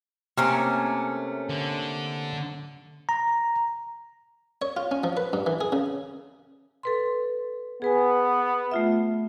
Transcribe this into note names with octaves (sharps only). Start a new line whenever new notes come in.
C3 A3 A#3 C#4 A#5
D3
A#5
C#5
F4
C#4
F3
B4
G2
E3
G#4
C#3
A4 B4 C6
B3 G#4 B4 G#5
A3 F4 E5